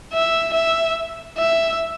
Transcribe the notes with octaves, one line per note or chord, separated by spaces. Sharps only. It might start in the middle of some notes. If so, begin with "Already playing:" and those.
E5
E5
E5